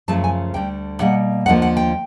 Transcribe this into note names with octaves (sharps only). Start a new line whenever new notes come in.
F#2 C#3 F3 A3 A5
G#5
D2 D3 G3 G5
B2 G3 A#3 F#5
D#2 D3 F3 A#3 F#5
F#5
G5